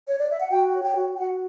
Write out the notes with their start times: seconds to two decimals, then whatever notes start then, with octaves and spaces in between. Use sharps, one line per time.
0.08 C#5
0.18 D5
0.29 E5
0.40 F#5
0.50 F#4 G5
0.73 C#5
0.84 G5
0.96 F#4
1.13 G5
1.18 F#4 F#5